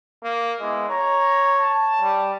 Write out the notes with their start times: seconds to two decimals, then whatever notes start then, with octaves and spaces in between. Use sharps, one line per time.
0.23 A#3
0.61 G#3 B3 E4 D#5
0.89 C#5 A#5
1.59 A5
2.01 G3